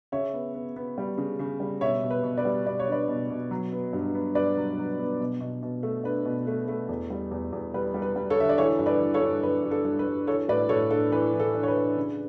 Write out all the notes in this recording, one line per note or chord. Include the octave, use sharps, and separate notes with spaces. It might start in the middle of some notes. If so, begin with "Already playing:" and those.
C#3 C#5 E5
B3
B3
B3
G3
C#3
C#3
G3
B2 C#5 E5
B2
B4
B2
B4 D5
G3
B2 D5
C#5
D4 B4 D5
B2
B2
F#3
B3
G2
B3
G2 B4 D5
F#3
F#3
B3
B2
B2
B2
A3
D4 B4
B2
A3
A3
E2
G3
E2
E2
G3 B4
G3
B4
G3
A4 C#5
D3 E5
D5
E3 A4 C#5
G2
B4 D5
E3
A4 C#5
G2
G2 B4
G2
A4
G2
B4
G2
E3 A4 C#5
A2 B4 D5
A2 A4 C#5
D4 A4
E3 B4
E3
A4
D4
C#5
B4
D4
C#3